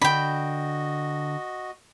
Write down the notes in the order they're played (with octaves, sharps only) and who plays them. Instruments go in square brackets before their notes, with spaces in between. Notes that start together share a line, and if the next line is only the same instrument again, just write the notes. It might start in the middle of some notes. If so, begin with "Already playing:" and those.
[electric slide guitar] D3 D4 [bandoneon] F#4 D#5 [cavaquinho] G5 B5